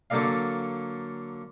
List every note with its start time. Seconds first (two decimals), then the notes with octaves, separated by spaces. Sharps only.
0.10 D3 F#3 A#3 A4 D5 F5